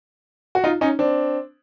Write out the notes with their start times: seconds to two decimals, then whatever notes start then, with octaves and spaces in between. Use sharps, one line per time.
0.55 F#4
0.64 D#4 F4
0.81 C#4 D#4
0.99 C4 D4